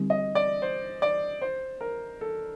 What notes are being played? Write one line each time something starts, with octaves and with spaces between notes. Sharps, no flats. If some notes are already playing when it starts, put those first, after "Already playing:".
Already playing: D3 G3 C4 D#4 G4
D#5
D5
C5
D5
C5
A#4
A4